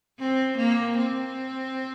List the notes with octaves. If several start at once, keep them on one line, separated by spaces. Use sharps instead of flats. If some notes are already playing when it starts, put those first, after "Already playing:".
C4
A#3
C4